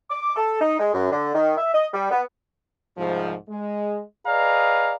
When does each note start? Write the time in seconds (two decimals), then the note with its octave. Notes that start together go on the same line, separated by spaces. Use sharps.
0.10 D6
0.35 A4
0.61 D#4
0.80 G#3
0.94 F#2
1.11 D3
1.34 D#3
1.57 E5
1.73 D#5
1.93 G3
2.11 B3
2.97 C2 G#2 F3
3.49 G#3
4.26 G#4 B4 D5 D#5 F5 A#5